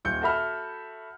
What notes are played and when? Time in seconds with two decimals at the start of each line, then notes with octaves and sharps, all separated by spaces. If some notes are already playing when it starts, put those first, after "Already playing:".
0.05 D#1 G6 C#7
0.22 F#4 A4 E5 B5 F6